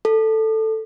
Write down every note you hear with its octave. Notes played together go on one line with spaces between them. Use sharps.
A4